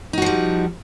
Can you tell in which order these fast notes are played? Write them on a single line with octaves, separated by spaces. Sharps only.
D#4 F#4 F3 G3